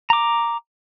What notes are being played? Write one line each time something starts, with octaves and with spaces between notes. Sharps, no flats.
A#5 D6